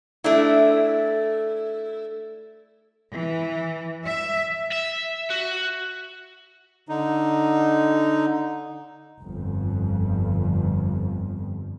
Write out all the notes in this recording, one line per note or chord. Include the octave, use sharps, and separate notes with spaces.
A3 D4 E4
E3
E5
E5
F#4
D3 D#4
G1 F2